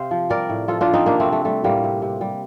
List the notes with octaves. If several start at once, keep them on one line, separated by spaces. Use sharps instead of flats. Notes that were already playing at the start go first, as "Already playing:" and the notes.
Already playing: C3 C5 F5
F3
G3 A#4 D5
A2
F3 F4 A4
D4 F4
F3
C4 D#4
C3 A#3 D4
A3 C4
C3
A3
G3 A3
A2 G3 A#3
C3
C3
G3